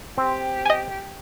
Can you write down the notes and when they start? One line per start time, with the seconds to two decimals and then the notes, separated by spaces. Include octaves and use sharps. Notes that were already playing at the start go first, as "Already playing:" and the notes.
0.18 C4 G4
0.65 D#5 G#5